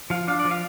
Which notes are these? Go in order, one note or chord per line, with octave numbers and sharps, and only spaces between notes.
F3 F5
D4 F5
D5
F3
F5